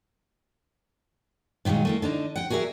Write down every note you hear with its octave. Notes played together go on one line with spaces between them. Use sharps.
A#2 D#3 F3 F#3 G#3
A3 A#3 E4
D3 D4 D#4
F#5 G5
F#4 G#4 A#4 D5 E5